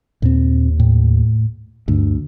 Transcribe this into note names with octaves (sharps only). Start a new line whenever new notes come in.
D#2 A#2 C4
A2
D2 G2